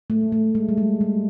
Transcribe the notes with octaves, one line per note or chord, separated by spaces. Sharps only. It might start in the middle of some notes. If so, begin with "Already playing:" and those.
A3
A3
G#3
G3
G#3
G3